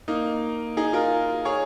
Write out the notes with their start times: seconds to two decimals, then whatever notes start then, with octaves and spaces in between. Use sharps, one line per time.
0.08 A#3 D#4
0.77 D#4 G#4
0.93 F4 A#4
1.45 G#4 C#5